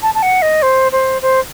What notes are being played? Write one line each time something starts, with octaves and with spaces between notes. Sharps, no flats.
A5
A5
F#5
D#5
C5
C5
C5